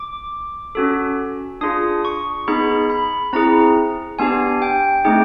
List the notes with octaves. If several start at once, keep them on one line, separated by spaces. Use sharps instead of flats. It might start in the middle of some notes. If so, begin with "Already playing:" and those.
Already playing: D6
C#4 F#4 A4
D4 F4 G#4 D#6
C#6
B3 D#4 G#4 B5
B5
C4 E4 G#4 A#5
B3 D4 G4 G#5
G5
A3 C4 D#4 G#4 G5